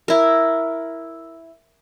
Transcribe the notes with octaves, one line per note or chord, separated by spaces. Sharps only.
E4 A#4